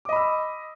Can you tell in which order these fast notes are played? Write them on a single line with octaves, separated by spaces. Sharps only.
D6 D#5 B5 E6